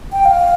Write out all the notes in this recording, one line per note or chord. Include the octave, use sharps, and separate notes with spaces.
G5
F5